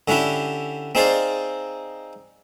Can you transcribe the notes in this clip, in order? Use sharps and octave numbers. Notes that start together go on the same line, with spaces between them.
D3 C#4 D4 E4 G4
C4 D#4 G#4 C5 D5 F5